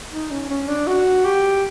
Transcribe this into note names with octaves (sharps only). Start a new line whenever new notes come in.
D#4
C#4
C#4
D4
F#4
G4